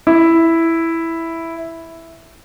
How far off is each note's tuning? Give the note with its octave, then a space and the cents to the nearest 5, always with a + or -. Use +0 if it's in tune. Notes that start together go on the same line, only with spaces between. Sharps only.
E4 +0